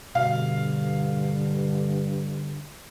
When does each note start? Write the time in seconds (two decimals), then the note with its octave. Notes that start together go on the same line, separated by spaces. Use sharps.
0.15 G2 B2 D3 F5